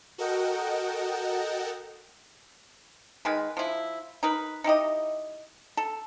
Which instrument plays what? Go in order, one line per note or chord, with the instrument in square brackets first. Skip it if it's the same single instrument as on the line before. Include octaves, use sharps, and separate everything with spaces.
[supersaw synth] F#4 A4 A#4 D#5 F#5 G5
[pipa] D#3 G#3 B4
F3 E4
D#4 A#4 B4
D#4 E4 G4 D#5
A4